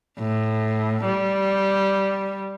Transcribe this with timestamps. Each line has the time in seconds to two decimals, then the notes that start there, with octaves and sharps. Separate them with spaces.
0.19 A2
1.05 G3